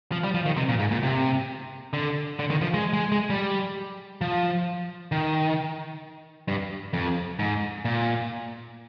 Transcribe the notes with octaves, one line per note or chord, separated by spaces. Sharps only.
F3
G3
F3
D#3
C3
A#2
G#2
A#2
C3
D3
D3
D#3
F3
G#3
G#3
G#3
G3
F3
D#3
G2
F2
G#2
A#2